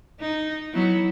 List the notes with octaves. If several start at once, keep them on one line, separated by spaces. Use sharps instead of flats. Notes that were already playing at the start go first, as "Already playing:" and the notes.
D#4
F#3 B3 E4